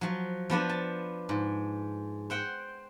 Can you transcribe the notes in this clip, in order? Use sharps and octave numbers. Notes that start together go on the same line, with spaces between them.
F3 F#3
F3 B3 D4 C5
A5
G#2
C5 F#5 G5